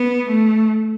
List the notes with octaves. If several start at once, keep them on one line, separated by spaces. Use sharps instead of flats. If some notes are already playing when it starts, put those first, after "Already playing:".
Already playing: B3
A3